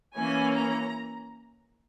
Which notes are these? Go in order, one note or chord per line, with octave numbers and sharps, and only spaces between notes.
E3 A#3 C#4 G#5
A#5